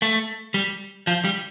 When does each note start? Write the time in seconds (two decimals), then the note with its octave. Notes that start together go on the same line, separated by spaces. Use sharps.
0.02 A3
0.54 G3
1.07 F3
1.24 G3